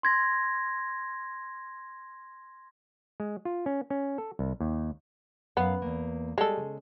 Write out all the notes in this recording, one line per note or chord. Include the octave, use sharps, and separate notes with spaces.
C6 G#6 A#6
G#3
F4
C#4
C#4
A4
C2
D#2
F#2 B3 F5
E2 A#3
G3 G#3 A4
C#3